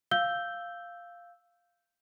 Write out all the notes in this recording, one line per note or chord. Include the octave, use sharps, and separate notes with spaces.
F5 E6 G6 G7